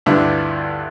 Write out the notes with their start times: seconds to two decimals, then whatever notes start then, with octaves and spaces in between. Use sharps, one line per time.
0.06 D2 G2 D4 E4 F4 B4